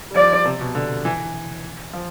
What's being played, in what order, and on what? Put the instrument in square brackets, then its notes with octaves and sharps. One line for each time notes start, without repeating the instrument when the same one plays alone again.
[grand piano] G3
[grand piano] F3 [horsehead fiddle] D5
[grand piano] C3
B2
D3
E3
F3